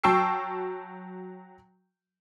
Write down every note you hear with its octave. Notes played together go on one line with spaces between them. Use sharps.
F#3 G5 A5 C#6 E6 C7